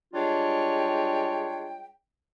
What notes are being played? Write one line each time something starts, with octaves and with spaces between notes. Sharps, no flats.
G3 G#3 D4 F4 C#5 G5